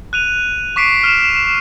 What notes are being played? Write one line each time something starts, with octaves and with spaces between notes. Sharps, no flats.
F#6 D#7 F7
C#6 D6 B6 C7 D7
F6 E7 F7